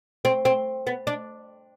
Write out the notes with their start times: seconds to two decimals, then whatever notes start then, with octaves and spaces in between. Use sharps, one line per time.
0.25 C4
0.45 C4
0.87 B3
1.07 D4